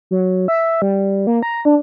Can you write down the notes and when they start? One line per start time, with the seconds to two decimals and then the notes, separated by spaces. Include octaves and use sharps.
0.11 F#3
0.48 E5
0.82 G3
1.27 A#3
1.43 A#5
1.65 D4